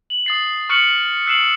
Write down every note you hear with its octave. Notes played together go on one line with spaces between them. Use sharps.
F#7
D#6 A6 C7
C#6 F6 F#6 C#7 D7 F#7
E6 F#6 C7 D7 E7 F#7